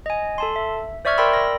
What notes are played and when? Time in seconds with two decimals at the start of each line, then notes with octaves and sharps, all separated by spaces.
0.06 D#5 G#5
0.38 A4 A5 C6
0.56 E5
1.05 C5 D5 E5 C#6 F6 G#6
1.18 A#4 D5 G5 B5 C6 E6
1.33 A#6